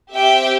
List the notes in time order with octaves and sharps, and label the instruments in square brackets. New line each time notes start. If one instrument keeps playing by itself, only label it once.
[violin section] C4 G4 E5 G5